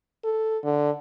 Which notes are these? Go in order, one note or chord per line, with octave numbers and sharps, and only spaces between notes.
A4
D3